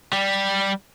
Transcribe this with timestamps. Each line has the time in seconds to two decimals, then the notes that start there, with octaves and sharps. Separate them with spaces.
0.12 G3